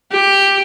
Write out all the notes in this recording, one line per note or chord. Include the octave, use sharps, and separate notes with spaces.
G4